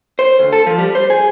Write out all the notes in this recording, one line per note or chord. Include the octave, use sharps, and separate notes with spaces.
C5
D2
A4
F3
G3
C5
G#4